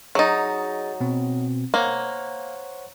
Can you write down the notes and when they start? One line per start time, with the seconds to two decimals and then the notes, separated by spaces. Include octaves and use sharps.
0.15 F#3 D#4 G#4 D#5 A6
1.01 B2 C4
1.74 A#3 C5 C#5 F#5